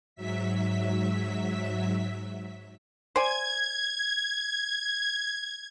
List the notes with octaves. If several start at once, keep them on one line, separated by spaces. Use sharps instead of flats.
G#2 F#3 E5 B6
C5 D5 G#5 G#6